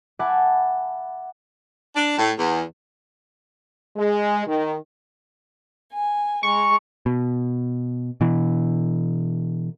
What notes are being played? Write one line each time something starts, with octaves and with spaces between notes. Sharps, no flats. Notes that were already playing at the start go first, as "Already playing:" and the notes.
E5 F#5 G#5 A5 B5 D6
D4
A2
E2
G#3
D#3
G#5
G#3 A#5 C#6
B2
B2 E3